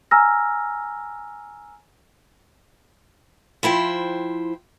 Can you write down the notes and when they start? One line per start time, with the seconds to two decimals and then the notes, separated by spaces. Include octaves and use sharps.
0.11 G#5 A#5 E6 F6 A#6
3.63 F3 E4 C5 G5